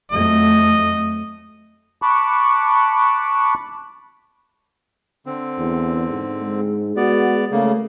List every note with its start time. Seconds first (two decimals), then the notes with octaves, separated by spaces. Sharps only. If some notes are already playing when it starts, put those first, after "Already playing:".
0.12 F2 F#3 A3 D#5
2.02 A5 B5 C#6 D6 F#6
5.26 D3 C4
5.58 E2
6.10 G#2
6.42 G#3
6.96 B3 F#4 D5
7.51 C#3 A3 A#3